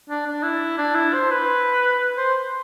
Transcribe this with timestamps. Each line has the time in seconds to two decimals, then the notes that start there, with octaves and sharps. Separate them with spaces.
0.09 D4
0.26 D4
0.43 E4
0.78 D4
0.95 E4
1.14 C5
1.31 B4
2.18 C5